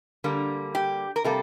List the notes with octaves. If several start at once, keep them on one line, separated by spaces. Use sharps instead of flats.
D3 G3 A#3
G4
A#4
C3 G3 A#3 A4